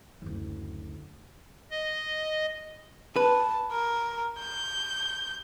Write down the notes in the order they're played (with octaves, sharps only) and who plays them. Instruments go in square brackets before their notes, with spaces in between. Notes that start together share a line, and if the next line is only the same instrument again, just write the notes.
[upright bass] F#1 D2
[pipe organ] D#5
[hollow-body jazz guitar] B4 [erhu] A5
[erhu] A#4
G6